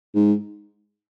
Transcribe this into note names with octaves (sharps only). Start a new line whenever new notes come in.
G#2